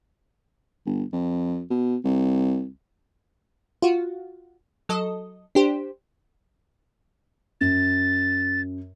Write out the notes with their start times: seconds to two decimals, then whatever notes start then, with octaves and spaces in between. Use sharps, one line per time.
0.86 G1
1.13 F2
1.70 B2
2.04 C2
3.82 F4 F#4
4.89 F#3 A4 D#5
5.55 D4 G4 C5
7.61 F#2 A6